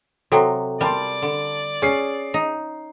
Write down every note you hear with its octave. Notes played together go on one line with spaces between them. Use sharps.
C3 F#3 F#4 A4 G5
G3 A#4 D5 A5 C6
D3
C#4 G#4 C7
D#4